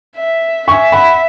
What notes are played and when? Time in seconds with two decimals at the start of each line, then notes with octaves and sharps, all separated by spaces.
0.17 E5
0.67 E5 G#5 C#6
0.92 F#5 B5